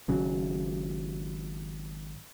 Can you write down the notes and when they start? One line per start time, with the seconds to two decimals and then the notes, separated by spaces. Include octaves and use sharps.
0.08 G#1 C#3 F#3